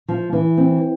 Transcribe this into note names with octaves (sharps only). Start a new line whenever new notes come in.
F3
E3
C4